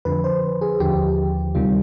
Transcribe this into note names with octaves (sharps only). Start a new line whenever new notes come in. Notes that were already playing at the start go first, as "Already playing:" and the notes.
F2 D3 F3 B4
C5
G#4
D#2 D3 F3 G4
D2 C3 D#3 G3 F4